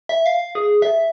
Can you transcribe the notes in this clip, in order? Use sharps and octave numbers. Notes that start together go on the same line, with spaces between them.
E5
F5
G#4
E5